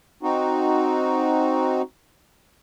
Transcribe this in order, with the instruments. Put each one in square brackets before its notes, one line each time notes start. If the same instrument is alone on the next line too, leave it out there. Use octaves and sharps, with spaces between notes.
[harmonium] C4 D#4 F#4